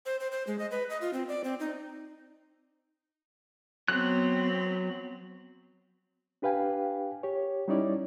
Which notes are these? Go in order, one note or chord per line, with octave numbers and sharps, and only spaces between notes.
C5
C5
C5
G#3
D#5
B4
D#5
F4
C4
D5
C4
D#4
F#3 B3 C4 F#6
D4 G4 B4 F5 G5 G#5
G4 C#5
G3 C#4 D#4 E4 C#5 D5